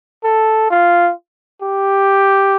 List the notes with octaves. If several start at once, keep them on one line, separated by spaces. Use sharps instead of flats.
A4
F4
G4